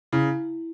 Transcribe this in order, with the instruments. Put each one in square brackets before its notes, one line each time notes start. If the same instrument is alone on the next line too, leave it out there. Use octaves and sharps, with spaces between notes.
[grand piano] C#3 [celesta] E4